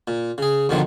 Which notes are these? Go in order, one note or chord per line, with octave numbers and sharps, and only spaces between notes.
A#2
C#3 G#4
D#2 B2 D3 D#3 F3 F#3